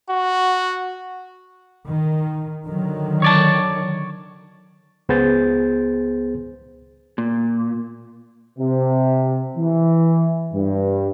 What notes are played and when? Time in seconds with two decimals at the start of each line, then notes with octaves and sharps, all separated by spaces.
0.10 F#4
1.87 D#3
2.65 D3 D#3 F#3
3.22 C#5 D5 A5
5.09 C#2 B3 G#4 C5 G6 A6
7.18 A#2
8.59 C3
9.57 E3
10.53 G2